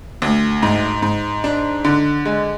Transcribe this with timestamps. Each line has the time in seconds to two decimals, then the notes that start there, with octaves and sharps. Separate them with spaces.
0.22 D2
0.63 G#2
1.02 G#2
1.44 D4
1.85 D3
2.25 G#3